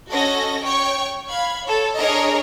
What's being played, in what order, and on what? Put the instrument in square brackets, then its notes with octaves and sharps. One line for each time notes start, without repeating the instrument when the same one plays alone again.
[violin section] C#4 F#4 A4 D#5 A#6
C#5 G5 C#6
F5 B5 G#6
A4 C#5
D4 G#4 A#4 C#5 D#5 A#5